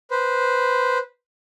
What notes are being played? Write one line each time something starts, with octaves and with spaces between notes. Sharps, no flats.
B4 C5